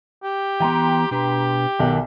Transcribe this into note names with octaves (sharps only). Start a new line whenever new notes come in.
G4
E3 B3 G5 A#5 C6
B2 D4 G4 B4
B1 D#3 A#4 F#5